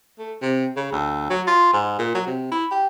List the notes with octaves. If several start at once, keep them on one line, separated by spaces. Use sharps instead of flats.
A3
C3
C#3
D2
F#3
F4
G#2
A#2
F#3
C3
E4
G4